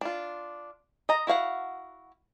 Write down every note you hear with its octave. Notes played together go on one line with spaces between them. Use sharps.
D4 F4
D#5 A#5
E4 F#4 F5 F#5